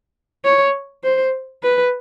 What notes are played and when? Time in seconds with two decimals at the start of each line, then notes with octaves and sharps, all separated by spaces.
0.44 C#5
1.04 C5
1.63 B4